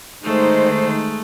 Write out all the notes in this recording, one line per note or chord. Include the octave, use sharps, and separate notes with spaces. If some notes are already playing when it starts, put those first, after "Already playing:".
D#3 G#3 A3 C5